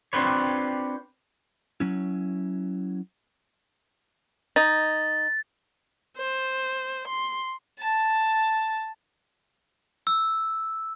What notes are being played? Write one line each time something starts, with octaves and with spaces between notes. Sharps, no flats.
C4 D4 F4 G4 B4 C#5
F#3 C#4 E4
D#4 A6
C5
C6
A5
E6